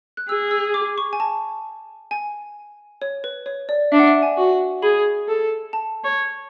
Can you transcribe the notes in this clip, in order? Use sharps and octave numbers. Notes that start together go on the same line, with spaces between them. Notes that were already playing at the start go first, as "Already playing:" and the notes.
F#6
G#4 E6
E6
D6
C#6
G#5
A5
G#5
C#5
B4
C#5
D5
D4 E5
F#5
E5
G#5
F#4
G#4 B5
A4
A5
C#5